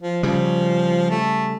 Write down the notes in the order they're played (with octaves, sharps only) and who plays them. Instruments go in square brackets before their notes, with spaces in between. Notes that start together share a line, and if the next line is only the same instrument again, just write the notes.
[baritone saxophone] F3
[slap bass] C#3 G3 [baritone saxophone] F3
[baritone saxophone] A3